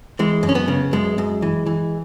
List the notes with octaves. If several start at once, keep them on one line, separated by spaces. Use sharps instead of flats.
E3 G#3
F#2
C#4
B3
C#3
F#2 G#3
F#2
E3
E3